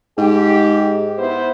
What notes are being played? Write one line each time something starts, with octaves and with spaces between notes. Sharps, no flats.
G#2 G4
B3 E4 C5